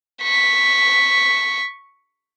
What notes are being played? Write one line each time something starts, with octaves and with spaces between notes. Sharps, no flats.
C#6 B6